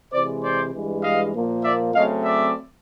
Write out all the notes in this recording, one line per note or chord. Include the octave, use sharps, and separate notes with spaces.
C3 E3 G#3 C5 D5
C5 D5
G2 E3 G#3
D#5 F5
A#2 F3 A#3
D5 E5
C#3 F#3 A3 C4 D#5 F5
D5 E5